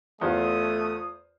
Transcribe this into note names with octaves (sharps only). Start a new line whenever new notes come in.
E2 A3 F4 C5 F5 D#6